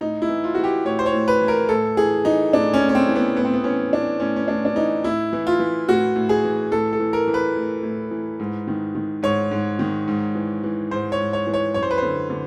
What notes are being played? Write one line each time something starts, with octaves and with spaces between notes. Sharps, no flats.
A2 D#4
E4
E3
F4
E3 F#4
G4
A2 C#5
C5
C#5
A2
B4
E3
A#4
A2 A4
E3 G#4
E3 D#4
A2 D4
C#4
A2
C#4
C4
E3
B3
A2 B3
C4
B3
E3 C#4
E3 D4
A2 C#4
C#4
A2 D4
D4
E3 D#4
A2 E4
E3
F4
E3
A2 F#4
A2
G#4
E3
A2 A4
A4
E3
A#4
E3
B4
A2
A2
E3
G#2
D#3
D#3
G#2 C#5
G#2
D#3
G#2
E3
E3
G#2 C5
C#5
G#2
C#5
E3
C#5
F#2 C#5
C5
B4
D3 C5
D3